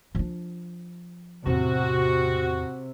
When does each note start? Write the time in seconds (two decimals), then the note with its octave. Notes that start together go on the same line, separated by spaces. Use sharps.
0.15 F3 D4
1.46 E2 A2 C3 F#4